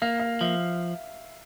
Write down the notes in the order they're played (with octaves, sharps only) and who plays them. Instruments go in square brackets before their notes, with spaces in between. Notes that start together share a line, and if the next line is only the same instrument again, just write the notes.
[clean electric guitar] A#3 [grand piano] F5
[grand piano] F5
[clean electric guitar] F3 [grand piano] E5